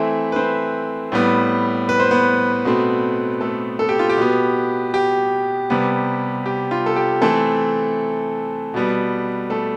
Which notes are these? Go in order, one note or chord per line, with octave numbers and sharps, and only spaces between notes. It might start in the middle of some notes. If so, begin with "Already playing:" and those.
Already playing: E3 A3 C4 E4 E5
B4
C4 C5
A2 G3 B3
B4
C5
B3 B4
B2 A3 C4
A3 A4
A4
G4
F4
G4
B2 B3
G4
C3 G3 B3
G4
F4
A4
G4
E3 A3 C4 A4
B2 G3 B3
A3 A4